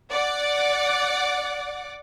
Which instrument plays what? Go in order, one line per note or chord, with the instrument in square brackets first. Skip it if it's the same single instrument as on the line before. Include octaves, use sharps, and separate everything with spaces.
[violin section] D5 F#5 D6